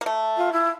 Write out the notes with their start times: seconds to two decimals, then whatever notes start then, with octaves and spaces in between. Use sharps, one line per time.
0.01 A#3
0.06 A3
0.37 F4
0.52 E4